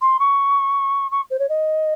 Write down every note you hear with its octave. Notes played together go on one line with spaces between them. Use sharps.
C6
C#6
C#6
C5
C#5
D#5